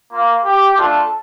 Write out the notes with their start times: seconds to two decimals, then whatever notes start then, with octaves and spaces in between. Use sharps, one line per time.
0.13 A#3 F4
0.44 G4
0.76 A3 D4 F4 A4